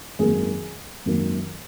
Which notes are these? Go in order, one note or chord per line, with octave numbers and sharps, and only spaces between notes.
G#1 F#2 D#3 A#3 G#4
G#1 F#2 D#3 A#3